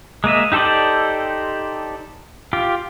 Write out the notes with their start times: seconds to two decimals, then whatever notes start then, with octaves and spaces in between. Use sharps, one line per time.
0.24 G#3 A#3 D#5 E5
0.52 D#4 G4 A4 C5 D5
2.53 F4 G4